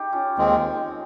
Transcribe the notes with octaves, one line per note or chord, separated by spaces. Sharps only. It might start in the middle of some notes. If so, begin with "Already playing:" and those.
Already playing: D#4 G4
C#4 F4
D#2 D#3 G#3 C4